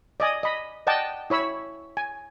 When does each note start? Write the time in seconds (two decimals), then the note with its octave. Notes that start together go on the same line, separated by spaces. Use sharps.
0.20 D5 D#5 G#5 D#6
0.43 D#5 B5
0.87 D5 D#5 F#5 G5 A5
1.30 E4 C#5 B5 E6
1.97 G#5